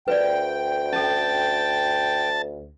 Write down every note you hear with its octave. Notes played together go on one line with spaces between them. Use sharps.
D2 B4 D5 G5
C#4 A4 A5